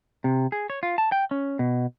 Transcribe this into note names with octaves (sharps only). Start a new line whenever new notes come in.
C3
G#4
C#5
F4
A5
G5
C#4
B2